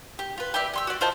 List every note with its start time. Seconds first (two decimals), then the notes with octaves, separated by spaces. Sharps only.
0.19 G4
0.38 F4 B4
0.54 G4 B4 D5 E5
0.74 G4 C6 E6
0.87 F#4 D5
1.01 F4 C5 D#5 A5